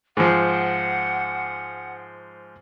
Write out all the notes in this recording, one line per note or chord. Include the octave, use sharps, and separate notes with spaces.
G#2 F3 F#5